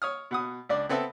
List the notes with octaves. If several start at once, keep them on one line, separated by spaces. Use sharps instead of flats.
C#5 D#6 F6
B2 F#5 D#6
C#2 D4 D5
B3 C4 A4 B4 E5